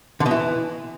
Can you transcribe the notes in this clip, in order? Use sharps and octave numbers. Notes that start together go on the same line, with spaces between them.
D3
B2
E3